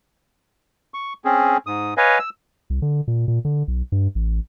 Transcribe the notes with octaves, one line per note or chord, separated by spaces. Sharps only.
C#6
C4 C#4 G#4
G#2 D#6
B4 C#5 D#5 F5 G#5
E6
C2
D3
A#2
A#2
D3
B1
G2
A1